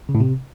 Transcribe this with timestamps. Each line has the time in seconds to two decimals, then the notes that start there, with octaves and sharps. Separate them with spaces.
0.09 C#3
0.15 A2
0.20 C3